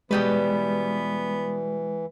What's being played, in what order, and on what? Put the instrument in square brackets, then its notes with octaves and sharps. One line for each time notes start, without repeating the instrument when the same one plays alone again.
[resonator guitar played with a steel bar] B2 G3 B4 [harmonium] E3 [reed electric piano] G#3 [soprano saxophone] B3